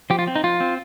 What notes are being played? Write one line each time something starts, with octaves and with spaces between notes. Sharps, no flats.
F3 G4
F4
C4
D#4
F3 F4
C4